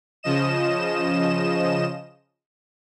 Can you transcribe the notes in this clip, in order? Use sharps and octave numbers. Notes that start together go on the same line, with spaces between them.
C#3 F3 D#5 E7